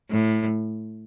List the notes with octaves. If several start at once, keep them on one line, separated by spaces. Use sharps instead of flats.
A2